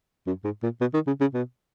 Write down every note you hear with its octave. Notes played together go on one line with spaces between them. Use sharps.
F#2
G#2
A#2
B2
D#3
C#3
C#3
B2